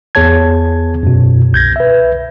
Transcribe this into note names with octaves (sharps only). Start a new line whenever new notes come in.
E2 B3 G#4 C#5 A5 G#6
F#2 B2
C2 G6 G#6 A#6
B4 E5